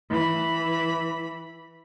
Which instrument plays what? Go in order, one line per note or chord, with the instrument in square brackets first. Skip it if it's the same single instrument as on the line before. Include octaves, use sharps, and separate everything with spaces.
[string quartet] E3 B5